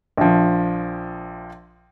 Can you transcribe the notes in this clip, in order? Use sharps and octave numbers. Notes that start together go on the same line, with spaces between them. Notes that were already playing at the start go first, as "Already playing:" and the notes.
A#1 F3